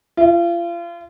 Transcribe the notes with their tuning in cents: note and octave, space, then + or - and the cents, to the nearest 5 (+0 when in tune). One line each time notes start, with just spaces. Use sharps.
F4 -35